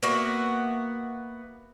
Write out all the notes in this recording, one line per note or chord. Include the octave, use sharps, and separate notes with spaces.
A#3 B3 F#4 E5